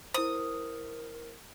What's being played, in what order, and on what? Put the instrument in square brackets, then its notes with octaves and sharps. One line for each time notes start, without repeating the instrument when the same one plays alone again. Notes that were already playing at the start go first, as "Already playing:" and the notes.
[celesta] E4 C5 [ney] A#4 [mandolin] D#6